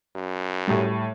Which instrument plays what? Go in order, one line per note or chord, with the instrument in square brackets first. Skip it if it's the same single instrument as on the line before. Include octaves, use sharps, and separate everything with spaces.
[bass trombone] F#2
[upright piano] A2 G3